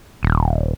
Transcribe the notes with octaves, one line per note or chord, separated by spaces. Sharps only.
D#1